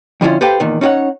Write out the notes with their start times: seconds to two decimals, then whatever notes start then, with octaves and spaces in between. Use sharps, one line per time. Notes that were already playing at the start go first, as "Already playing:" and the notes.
0.21 F2 D3 C#4 E4 F4
0.41 G4 A4 B4 C5 F5 G5
0.60 E2 A#2 D#3
0.81 C#4 D#4 F#4 C#5 F#5